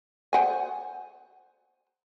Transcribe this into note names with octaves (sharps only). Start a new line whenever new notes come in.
C5 F#5 G#5